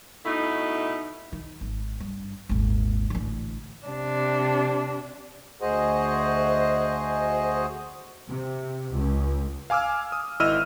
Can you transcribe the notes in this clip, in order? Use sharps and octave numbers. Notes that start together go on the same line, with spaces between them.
B2 A3 D#4 E4
D#3
G#1
G2
D#1 G#1
A1 D3
C3 D4
D2 F#4 G#4 C5 D#5
C3
C#2
F5 G#5 D6 E6 F6
D#6
G#1 E4 D#5 E6 F6 D#7